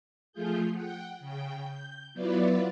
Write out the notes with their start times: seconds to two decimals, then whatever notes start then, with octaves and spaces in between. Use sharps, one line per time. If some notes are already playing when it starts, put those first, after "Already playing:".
0.32 F3 A3 F4 G#4 G6
0.73 F#5 G5
1.20 C#3 G5
1.64 G6
2.13 F#3 B3 E4 F4 B4 D5